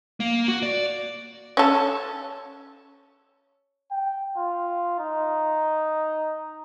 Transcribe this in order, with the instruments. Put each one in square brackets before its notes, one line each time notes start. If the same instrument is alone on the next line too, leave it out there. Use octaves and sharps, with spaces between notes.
[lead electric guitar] A#3
F#4
D5
[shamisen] C#4 A4
[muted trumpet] G5
F4
D#4